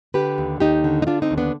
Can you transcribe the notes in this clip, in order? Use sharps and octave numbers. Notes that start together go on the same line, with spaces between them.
D3 G4 B4
D#2
D#2 D#4 G4
D3
D#4
D3 D4 F4
C4 D#4
D#2
B3 D4